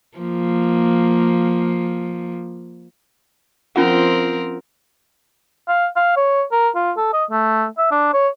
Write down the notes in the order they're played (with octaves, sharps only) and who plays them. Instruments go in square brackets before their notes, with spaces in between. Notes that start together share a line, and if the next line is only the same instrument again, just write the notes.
[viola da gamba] F3 A#3
[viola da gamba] F3 C4 A#4 [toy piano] C#4 F4 F#5
[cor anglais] F5
F5
C#5
A#4
F4
A4
D#5
A3
E5
D4
C#5